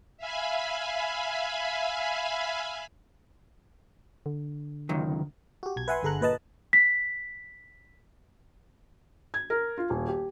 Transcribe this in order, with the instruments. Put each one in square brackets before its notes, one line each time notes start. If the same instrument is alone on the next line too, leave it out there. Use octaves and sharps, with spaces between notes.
[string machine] E5 F5 G#5 B5
[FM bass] D3
[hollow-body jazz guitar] C#2 F#2 D#3
[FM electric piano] F#4 G4
B1 G#6
B4 E5 F#5 G#5 B5 C6
G1 D3 G#4 A4 A#5 F#6
A#2 B4 D#5 A5
[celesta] B6
[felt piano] G#6
A#4
F4
D#1
G4